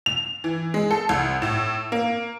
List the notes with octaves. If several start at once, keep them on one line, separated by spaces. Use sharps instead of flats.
F7
E3
G#3
A4
C2
A2
A#3